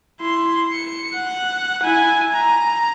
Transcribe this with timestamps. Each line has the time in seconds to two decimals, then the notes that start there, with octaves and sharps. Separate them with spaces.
0.21 E4 C6
0.74 C#7
1.15 F#5
1.83 E4 G#5
2.33 A#5